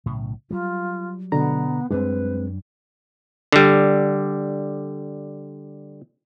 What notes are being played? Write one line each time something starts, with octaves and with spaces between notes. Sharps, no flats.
B1 A2 C#3
F#3 G3 F4
B2 D3 B3 A#5
F#2 G3 G#3 C4 D4 B4
D3 G3